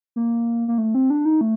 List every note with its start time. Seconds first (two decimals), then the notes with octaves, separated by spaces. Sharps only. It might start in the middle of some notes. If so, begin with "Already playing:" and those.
0.16 A#3
0.68 A#3
0.78 A3
0.95 C4
1.10 D4
1.25 D#4
1.41 A3